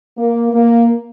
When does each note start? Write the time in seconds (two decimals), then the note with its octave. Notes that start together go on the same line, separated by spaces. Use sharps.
0.17 A#3
0.53 A#3